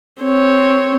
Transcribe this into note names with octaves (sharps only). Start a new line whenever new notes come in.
C4 C#5